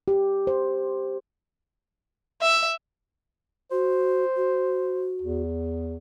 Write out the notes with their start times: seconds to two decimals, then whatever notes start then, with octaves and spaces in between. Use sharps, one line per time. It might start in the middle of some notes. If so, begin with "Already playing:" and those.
0.08 G4
0.47 C5
2.42 E5
3.71 F#4 C5
4.37 F#4
5.22 E2